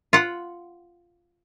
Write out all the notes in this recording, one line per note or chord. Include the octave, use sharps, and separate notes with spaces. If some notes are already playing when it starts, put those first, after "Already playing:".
F4 F#5